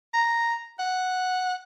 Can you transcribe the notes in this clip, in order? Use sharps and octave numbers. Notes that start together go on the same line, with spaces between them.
A#5
F#5